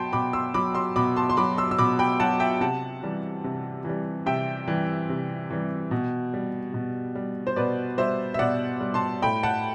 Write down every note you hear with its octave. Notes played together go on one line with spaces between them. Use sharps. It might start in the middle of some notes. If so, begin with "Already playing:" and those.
Already playing: B2 F#3 G5 A5 B5 C6
B2 B5 D6
C6 E6
F#3 B5 D6
C6 E6
B2 B5 D6
A5 C6
C6
F#3 B5 D6
C6 E6
E6
B2 B5 D6
G5 B5
F#3 F#5 A5
E5 G5
C3 F#5 A5
E3 G3
C3
E3 G3
C3 E5 G5
E3 G3
C3
E3 G3
B2
G3
B2
G3
C5
B2 B4 D5
G3 C5 E5
E5
B2 D5 F#5
G3
A5 C6
A2 G5 B5
F#5 A5